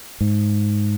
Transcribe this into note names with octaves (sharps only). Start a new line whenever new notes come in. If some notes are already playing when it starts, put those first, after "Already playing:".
G#2